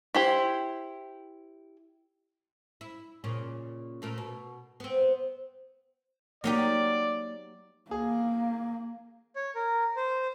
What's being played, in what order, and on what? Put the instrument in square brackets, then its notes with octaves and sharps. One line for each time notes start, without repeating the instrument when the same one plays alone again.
[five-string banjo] E4 G4 C5
[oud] E4
A#2 C#3 C#4
A#2 A3 A#4
B2
B3 C4
[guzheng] F#3 D#4 G4 [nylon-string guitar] A#3 [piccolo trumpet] D5
[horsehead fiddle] A#3 [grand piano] G#4
[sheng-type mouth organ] C#5
A#4
C5